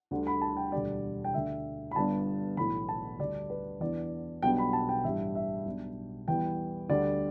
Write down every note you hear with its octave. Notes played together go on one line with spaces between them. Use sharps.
D2 D3 G3 D4
B5
A5
G5
E1 D2 D3 G3 D5
G5
D2 D3 A3 D4 E5
B5
G1 G2 G3 B3 D4 A5
B1 A2 E3 B5
A5
D2 D3 G3 D4 D5
B4
E2 E3 B3 D4 D5
B1 B2 G3 B3 D4 G5
B5
A5
G5
A1 G2 G3 D4 E5
E5
B1 B2 G3 D4
E2 E3 G3 B3 G5
D2 D3 G3 D4 D5